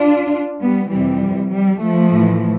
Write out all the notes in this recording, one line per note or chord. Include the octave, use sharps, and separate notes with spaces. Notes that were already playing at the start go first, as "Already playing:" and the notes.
Already playing: D4 F4
G3 B3
F2 C3 E3 G3
G3
F3 A3
A2 E3